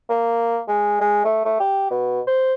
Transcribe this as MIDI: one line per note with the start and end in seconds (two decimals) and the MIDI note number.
0.10 0.61 58
0.68 0.98 56
1.01 1.24 56
1.25 1.42 57
1.45 1.59 57
1.60 1.88 67
1.90 2.20 47
2.27 2.54 72